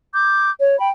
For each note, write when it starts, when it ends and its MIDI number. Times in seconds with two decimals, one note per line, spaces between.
0.14 0.50 86
0.14 0.50 91
0.60 0.78 73
0.79 0.89 79
0.79 0.89 83